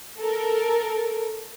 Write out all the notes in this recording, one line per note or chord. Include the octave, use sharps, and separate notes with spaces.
A4 A#4